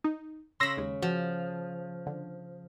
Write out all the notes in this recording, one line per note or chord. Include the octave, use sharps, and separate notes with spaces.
D#4
C#3 B5 C6 E6 A#6
D#2 G#3
F3 F#4
D3